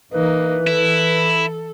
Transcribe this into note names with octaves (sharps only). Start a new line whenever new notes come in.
E3 A#3 D#4 B4
E4 A4